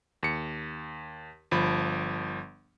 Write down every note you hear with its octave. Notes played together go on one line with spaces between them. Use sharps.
D#2 C#7
G1 F3 B5